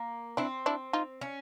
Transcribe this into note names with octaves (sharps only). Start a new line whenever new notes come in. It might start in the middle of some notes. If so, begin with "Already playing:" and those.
Already playing: A#3
C4 D4 E4
D4 E4
D#4 F4
C#4